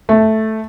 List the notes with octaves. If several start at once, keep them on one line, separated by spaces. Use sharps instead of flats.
A3